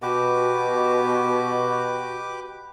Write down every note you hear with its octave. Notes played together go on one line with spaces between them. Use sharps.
B2 F#4 G4 B4 D6